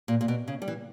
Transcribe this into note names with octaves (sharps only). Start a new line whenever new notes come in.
A#2
A#2
B2
C#3
G3
E3